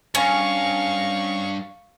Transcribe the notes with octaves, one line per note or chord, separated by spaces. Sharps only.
G2 C#4 F5 C#6